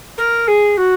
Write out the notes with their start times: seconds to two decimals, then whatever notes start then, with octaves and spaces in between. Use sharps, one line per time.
0.17 A#4
0.47 G#4
0.77 F#4